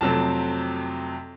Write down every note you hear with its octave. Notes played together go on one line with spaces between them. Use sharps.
F2 C3 F#3 A3 C4 A5